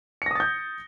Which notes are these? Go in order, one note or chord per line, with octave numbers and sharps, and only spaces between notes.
D#6 G6 A6 A#6 C#7